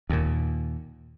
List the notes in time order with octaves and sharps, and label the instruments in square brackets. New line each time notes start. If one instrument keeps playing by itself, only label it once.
[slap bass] D#2 A#2